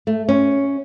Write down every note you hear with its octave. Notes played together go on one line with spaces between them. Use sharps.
A3
C#4